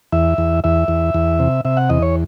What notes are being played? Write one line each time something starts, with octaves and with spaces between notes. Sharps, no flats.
E2 E5
E2
E2 E5
E2
E2
C3
C3 E5
F#5
E2 D#5
C#5